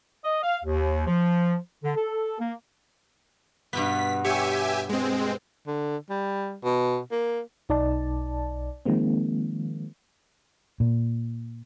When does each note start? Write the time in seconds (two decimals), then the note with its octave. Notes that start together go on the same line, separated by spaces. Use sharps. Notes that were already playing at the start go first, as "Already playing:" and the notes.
0.24 D#5
0.43 F5
0.64 D#2
1.07 F3
1.84 D3
1.95 A4
2.39 A#3
3.73 G2 B2 B3 B6
4.24 G4 C#5 E5 G#5
4.89 G#3 C4
5.67 D3
6.10 G3
6.64 B2
7.12 A#3
7.69 B1 D#4 D5 A5
8.85 D#3 F3 G#3 A#3 C4
10.80 A#2